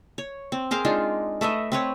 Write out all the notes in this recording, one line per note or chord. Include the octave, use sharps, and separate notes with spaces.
C#5
C4
G#4 A#4 C5 F5
G#3 D4 D#4 F4
A3 B4 D#5 E5
C4 B4 C#5 F#5